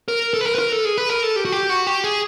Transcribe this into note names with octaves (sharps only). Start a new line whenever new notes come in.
A#4
A4
B4
A#4
B4
A#4
A4
G#4
B4
A#4
A4
G4
F#4
G4
F#4
G4
G#4